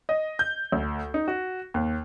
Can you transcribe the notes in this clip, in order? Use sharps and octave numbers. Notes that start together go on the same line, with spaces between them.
D#5
G6
D2
D#4
F#4
D#2